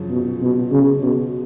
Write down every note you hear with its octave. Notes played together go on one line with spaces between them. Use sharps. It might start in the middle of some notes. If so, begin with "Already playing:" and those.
Already playing: F#2 C#3 F3
B2
B2
C#3
B2